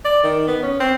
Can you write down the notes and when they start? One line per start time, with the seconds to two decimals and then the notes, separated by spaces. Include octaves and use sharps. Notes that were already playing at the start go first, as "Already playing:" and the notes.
0.05 D5
0.23 D#3
0.47 B3
0.63 C#4
0.80 C4